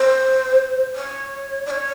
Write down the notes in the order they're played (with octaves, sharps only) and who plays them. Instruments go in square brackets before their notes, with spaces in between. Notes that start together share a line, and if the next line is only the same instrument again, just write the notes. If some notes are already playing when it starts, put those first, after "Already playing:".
Already playing: [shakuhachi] C5
C#5
D5
C#5